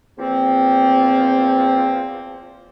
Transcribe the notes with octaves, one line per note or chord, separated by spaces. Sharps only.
E2 F3 A#3 C4